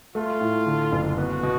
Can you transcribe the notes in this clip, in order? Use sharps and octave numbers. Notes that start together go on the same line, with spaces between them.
A3 F4
A2
D3
F#1
B3 F#4
B2